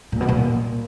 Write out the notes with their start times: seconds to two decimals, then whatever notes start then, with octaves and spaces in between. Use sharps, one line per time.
0.12 A#2
0.21 B2
0.29 A#2